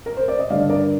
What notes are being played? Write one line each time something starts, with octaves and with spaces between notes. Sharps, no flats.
A#4
C5
D5
D#5
G2 D3 D5 F5
A#4 D5